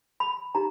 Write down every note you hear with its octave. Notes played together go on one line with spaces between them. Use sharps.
B5
D#4 G4 A#5